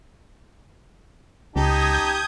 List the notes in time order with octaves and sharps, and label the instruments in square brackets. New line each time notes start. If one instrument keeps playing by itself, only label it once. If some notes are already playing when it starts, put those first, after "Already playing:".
[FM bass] C#2 [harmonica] D#4 G4 A5 [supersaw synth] D#6 G6 G#6